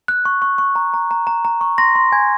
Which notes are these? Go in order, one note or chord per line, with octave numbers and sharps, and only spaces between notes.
F#6
C#6
C#6
C#6
A#5
A#5
A#5
A#5
A#5
C#6
C6 A#6
C6
G#5 G#6